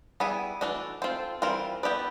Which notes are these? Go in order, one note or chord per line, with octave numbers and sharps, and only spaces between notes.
G3 B3 E4 G#4
E3 A3 D4 F#4
C4 F4 A4 C5
E3 G3 C4 F4 A#4
B3 E4 G4 B4 D5